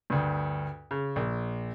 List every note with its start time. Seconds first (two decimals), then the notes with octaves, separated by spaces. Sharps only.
0.10 D2 G2
0.91 C#3
1.16 A#1